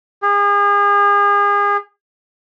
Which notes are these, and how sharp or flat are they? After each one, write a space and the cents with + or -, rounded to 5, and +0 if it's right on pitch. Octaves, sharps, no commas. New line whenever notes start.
G#4 -40